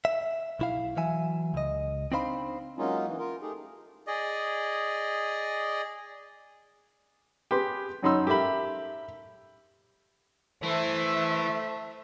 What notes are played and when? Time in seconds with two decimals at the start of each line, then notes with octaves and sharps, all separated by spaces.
0.05 E5
0.59 B1 E4 F5
0.97 E3 F#3 E5 G#5
1.54 C#2 D#5
2.12 C4 D4 D#4 C5 F5 B5
2.78 F#3 G#3 A#3 C#4 D#4 F4
3.06 E3
3.19 F4 A#4
3.42 A3 D#4 G4 G#4
4.07 G#4 D5 D#5
7.51 G4 G#4 B4 C6
8.03 F#2 C#4 D#4 B5 C6 E6
8.27 G4 A4 A#4 E5 B5
10.63 E3 A3 C5 E5